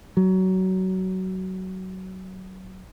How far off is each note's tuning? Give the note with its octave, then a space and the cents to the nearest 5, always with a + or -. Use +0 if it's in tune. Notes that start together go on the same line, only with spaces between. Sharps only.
F#3 +20